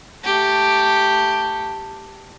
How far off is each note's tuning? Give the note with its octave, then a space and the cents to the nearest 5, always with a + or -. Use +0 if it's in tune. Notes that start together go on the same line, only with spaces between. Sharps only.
A3 +10 G4 +0